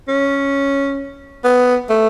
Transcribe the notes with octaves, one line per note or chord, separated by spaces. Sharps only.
C#4
B3
A3